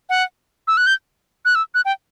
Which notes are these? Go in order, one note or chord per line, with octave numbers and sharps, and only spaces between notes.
F#5
E6
F#6
G6
F#6
E6
F#6
G5